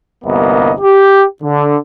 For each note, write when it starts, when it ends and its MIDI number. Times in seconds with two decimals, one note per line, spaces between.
0.25 0.73 31
0.25 0.73 36
0.25 0.73 58
0.25 0.73 59
0.25 0.73 75
0.80 1.25 67
1.43 1.76 50